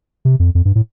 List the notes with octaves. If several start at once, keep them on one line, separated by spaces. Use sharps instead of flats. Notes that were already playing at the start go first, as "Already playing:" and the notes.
C3
F2
F2
G2
A2